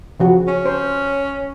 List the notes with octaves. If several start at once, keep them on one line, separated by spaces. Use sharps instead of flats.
C#3 F3 F#4
C#4
C5